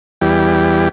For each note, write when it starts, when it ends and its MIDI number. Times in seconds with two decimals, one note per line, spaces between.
0.21 0.88 40
0.21 0.88 55